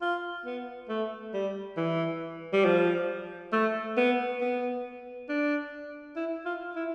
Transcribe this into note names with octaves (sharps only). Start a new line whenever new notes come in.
F4
B3
A3
G3
E3
G3
F3
A3
B3
B3
D4
E4
F4
E4